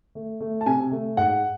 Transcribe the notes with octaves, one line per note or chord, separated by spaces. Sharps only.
A3
A3
A5
C3 G#5
A3
G#2 F#5